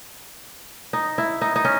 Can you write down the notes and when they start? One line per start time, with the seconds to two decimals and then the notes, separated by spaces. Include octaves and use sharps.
0.93 D#4
1.18 E4
1.41 D#4
1.56 D#4
1.65 C#4